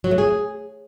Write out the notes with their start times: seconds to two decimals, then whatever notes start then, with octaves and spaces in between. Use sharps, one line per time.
0.04 F#3
0.11 A3
0.18 G#4